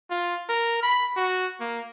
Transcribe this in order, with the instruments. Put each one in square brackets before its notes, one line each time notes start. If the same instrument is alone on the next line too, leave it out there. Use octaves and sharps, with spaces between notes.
[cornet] F4
A#4
B5
F#4
A#3